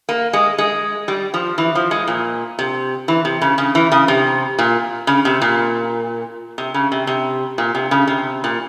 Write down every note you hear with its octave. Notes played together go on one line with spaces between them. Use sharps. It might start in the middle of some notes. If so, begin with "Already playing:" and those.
A#3
G#3
G#3
G3
F3
E3
F3
G#3
A#2
C3
E3
C3
C#3
C#3
E3
C#3
C3
A#2
C#3
C3
A#2
C3
C#3
C3
C3
A#2
C3
C#3
C3
A#2